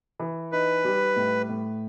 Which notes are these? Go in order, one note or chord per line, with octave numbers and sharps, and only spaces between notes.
E3
D#4 B4
G3
A2
A2